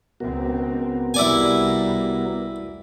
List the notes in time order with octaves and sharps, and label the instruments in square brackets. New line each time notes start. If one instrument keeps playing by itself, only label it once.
[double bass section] C#2 C4 [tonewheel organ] B3 F#4 A#4
[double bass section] C2 C3 G3 [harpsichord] E4 D5 G#5